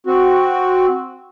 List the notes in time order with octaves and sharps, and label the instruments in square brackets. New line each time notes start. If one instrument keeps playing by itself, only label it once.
[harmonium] C4 F#4